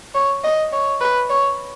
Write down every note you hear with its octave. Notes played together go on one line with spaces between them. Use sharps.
C#5
D#5
C#5
B4
C#5